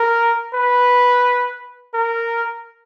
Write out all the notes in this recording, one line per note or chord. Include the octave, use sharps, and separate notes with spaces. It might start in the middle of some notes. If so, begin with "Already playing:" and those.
Already playing: A#4
B4
A#4